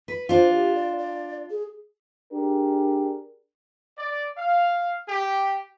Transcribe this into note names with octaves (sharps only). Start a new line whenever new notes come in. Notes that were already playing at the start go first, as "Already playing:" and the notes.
B4
D4 F4 C5
G4
D5
D5
G#4
D4 G4 G#4 A#4
D5
F5
G4